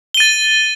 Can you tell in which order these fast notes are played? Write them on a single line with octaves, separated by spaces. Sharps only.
G7 D#7 A6